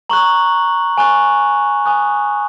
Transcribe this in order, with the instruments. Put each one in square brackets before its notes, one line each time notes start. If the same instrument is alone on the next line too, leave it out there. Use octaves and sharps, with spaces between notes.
[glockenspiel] A#5 C#6 F#6 F#7
G#5 C#6 F#6
G#5 D#6 F#6